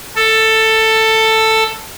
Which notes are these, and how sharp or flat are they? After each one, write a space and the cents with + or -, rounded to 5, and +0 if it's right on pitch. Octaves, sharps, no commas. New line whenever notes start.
A4 +10